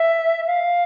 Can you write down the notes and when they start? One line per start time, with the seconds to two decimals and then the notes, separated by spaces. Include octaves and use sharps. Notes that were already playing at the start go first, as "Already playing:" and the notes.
Already playing: E5
0.46 F5